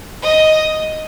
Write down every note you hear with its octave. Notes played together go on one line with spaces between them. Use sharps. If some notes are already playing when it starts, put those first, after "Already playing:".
D#5